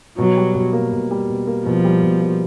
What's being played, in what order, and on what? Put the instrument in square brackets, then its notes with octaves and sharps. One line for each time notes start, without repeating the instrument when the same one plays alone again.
[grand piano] B2 [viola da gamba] F#3
[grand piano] G3
B2
A#3
B2
G3
B2
A#3
[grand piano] B2 [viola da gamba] F3
[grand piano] G3
B2
A#3